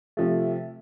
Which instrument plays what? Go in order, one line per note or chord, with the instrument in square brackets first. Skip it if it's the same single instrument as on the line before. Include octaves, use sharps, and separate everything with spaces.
[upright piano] C3 F3 A3